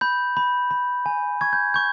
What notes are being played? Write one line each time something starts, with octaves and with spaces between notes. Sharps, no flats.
B5 G6
B5
B5
G#5
C#6 G#6
G6
C#6 G6